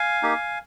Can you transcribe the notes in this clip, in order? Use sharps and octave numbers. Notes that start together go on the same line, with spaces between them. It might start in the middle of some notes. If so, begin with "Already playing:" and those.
Already playing: F5 G#5
A#3 D#4 G4